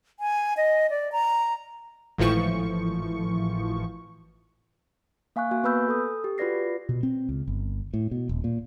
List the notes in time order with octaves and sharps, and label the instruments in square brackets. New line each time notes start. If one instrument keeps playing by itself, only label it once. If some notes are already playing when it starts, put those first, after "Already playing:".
[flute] G#5
D#5
D5
A#5
[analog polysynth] G#1 A2 E3 F3 C#6
[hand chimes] A#3 F5 G#5 C#6 F#6
A#3 F#4 G#5
B3 B4 B5 E6 G6
A4 D#6
G4
F4 F#4 B4 D5 A#6 C7
[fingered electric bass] B2
C4
C#2
G1
A2
B2
D#1
A#2